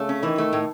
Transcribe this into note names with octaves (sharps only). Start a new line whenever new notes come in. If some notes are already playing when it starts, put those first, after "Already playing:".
Already playing: C#3 A3
C#4
D#3 E3
A3
A2